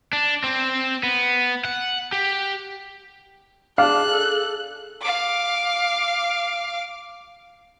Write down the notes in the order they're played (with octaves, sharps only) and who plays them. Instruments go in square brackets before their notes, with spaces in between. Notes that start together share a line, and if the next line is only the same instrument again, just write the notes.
[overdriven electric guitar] D4
C4
B3
F#5
G4
[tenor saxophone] D4 [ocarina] G#4 [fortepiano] F5 [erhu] F#6
[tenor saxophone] A4
[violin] F5 D6